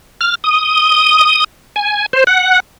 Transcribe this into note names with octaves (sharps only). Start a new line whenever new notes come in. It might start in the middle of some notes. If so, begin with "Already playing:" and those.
F6
D#6
G#5
C5
F#5